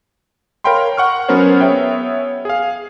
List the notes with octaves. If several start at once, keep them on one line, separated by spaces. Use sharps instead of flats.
A#4 C#5 F5 G5 B5 C6
F#5 C#6 F6
F#3 B3 C#4 A#4 C5 C#5
B3 G#4 C#5 E5 G5
G#4 F5